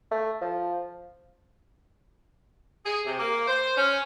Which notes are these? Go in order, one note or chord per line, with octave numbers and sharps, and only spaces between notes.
A3
F3
G#4
C3
A#3
C5
C#4